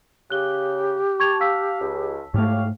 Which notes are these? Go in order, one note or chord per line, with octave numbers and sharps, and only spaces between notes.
C#3 G4 F#6 G7
A5 C#6 G#6 F7
F5 A5 E6 B6
C#2
G#2 A3 G4 C#5 F5